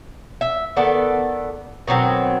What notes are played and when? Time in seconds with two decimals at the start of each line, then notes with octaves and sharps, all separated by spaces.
0.41 E5
0.76 D#3 B3 A4 D5
1.88 B2 D#3 F#3 C4